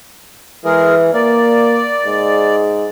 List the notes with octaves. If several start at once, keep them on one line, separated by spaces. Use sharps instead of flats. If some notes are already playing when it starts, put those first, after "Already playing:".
E3 G#3 G#4 A#4
A#3 D5
G#2